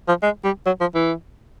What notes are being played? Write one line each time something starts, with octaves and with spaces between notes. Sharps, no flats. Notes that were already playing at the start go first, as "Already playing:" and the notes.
F3
G#3
G3
F#3
F3
E3